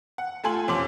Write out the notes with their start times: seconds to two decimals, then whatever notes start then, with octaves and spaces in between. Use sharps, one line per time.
0.18 F#5
0.44 A3 F4 A4 G#5 C6 F#7
0.68 F2 C#4 G4 C6 D6 F#7